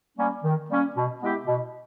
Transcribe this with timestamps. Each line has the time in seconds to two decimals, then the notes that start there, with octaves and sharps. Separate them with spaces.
0.18 G3 A#3 C#4
0.44 D#3
0.69 G3 A#3 C#4
0.95 B2
1.21 G#3 B3 E4 G4
1.46 B2